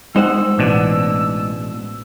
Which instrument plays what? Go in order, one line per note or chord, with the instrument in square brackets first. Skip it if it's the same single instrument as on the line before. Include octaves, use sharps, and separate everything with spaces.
[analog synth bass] G#3 [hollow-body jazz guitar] D#4 C5 F#5 [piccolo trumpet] E6
[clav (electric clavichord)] A1 B2 D4